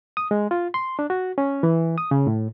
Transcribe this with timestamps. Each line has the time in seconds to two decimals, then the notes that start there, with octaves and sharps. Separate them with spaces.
0.17 D#6
0.31 G#3
0.51 F4
0.74 C6
0.99 D4
1.10 F#4
1.38 C#4
1.63 E3
1.98 D#6
2.11 C#3
2.27 A2